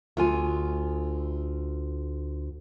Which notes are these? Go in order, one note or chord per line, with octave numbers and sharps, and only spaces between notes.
D2 F4 G#5